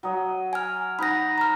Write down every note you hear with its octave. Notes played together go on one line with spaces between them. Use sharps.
F#3 D#5
G#5 F6
D#4 F#5 B5 A#6
A#5 F6